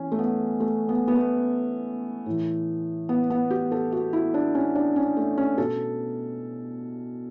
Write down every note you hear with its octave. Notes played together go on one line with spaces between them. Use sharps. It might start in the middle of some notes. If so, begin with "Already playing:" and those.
Already playing: E3 C#4
A3
B3
A3
B3
B3
A3
A2 E3
B3
B3
G4
A4
F#4
E4
D4
C#4
D4
C#4
A3
C#4
B2 A4